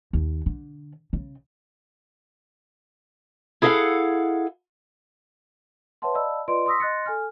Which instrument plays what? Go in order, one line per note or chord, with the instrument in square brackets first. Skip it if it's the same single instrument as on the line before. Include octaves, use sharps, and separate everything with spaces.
[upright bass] D#2
D3
C#3
[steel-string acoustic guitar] E4 G#4 A4 D#5 F5 F#5
[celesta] B4 C#5 E5 F#5 A5 C6
D5 D#5 F5 A5 B5 E6
F4 B4 D5 D#5 C6 D7
C6 C#6 D#6 E6 A#6 B6
D#5 C6 F#6 A6 A#6 C#7
A4 G#5 F6